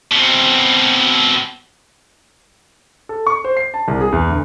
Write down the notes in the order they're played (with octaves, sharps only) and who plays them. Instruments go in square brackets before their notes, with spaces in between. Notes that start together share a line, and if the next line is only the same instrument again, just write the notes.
[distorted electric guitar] B2 C4
[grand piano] A4
C#6
C5
C7
A5
C2
G#4
E2
D2